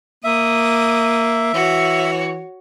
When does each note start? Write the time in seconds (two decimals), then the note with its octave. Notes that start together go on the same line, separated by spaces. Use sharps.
0.24 A#3 E5 D#6
1.54 E3 F#4 C#5